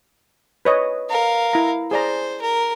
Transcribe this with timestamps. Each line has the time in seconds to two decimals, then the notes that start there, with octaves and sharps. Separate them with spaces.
0.65 B4 C#5 D#5
1.10 A#4 F5
1.53 E4 A#5
1.91 G#4 C5 D5 A#5
2.42 A#4